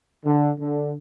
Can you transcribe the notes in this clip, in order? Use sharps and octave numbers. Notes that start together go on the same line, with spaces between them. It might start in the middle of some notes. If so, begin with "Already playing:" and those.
D3
D3